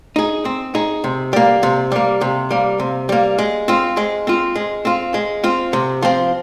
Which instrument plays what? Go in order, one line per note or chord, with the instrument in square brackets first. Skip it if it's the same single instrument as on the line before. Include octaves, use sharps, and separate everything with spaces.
[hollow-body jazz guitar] D#4 G#4
C4
D#4 G#4
C3
G3 A#3
C3
G3 A#3
C3
G3 A#3
C3
G3 A#3
G#3
C4 F4
G#3
C4 F4
G#3
C4 F4
G#3
C4 F4
C3
F3 C4